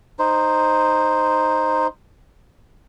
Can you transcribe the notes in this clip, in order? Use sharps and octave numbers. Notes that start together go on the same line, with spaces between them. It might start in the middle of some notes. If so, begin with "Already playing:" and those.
D#4 C5